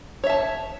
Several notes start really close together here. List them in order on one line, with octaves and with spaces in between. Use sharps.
C#5 E5 A5